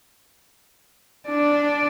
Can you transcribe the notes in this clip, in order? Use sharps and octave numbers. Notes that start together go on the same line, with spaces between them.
D4 D5